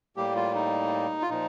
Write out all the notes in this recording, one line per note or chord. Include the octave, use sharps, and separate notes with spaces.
A2 G3 A#3 G4
F4
D#4
F4
A#2 F3 D#4